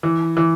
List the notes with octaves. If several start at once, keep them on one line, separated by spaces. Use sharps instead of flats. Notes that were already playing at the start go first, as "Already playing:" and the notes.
E3
E3